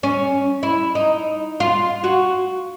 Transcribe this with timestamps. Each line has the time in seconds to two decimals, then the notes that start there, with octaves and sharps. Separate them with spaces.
0.03 C#4
0.63 E4
0.95 D#4
1.60 F4
2.04 F#4